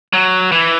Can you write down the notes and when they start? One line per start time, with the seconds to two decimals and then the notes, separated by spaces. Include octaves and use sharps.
0.13 F#3
0.52 E3